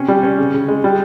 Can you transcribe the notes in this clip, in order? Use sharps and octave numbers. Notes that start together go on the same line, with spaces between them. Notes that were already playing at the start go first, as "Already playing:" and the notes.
Already playing: C3 C#4
G3
C#4
C#3
C#3
G#3
G3